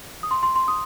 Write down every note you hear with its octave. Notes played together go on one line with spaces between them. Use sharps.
D#6
C6
C6
C6
D#6